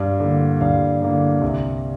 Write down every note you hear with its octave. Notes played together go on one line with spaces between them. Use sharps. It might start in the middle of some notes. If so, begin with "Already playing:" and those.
Already playing: G2 F5
D3 A#3
G2 F5
D3 A#3
C2